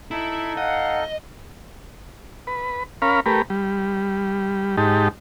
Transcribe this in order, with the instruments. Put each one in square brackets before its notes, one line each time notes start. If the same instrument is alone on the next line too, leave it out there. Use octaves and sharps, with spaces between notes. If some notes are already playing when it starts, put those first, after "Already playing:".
[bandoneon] D#4 A4 [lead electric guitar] E4
[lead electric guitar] D#5 [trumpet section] F5 F#5
[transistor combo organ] B4
C#4 A#4 F5 B5
A3 G4 A#4 B4
G3
G#2 D#4 G4 A5